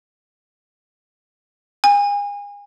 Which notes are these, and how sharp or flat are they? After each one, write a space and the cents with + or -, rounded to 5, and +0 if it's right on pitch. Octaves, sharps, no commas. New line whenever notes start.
G#5 -35